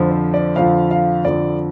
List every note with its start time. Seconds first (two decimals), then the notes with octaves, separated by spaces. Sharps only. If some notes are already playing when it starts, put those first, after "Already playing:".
Already playing: F2 D3 F3
0.11 C5
0.34 D5
0.56 F2 D3 F3 F5
0.91 F5
1.25 F2 D3 F3 D5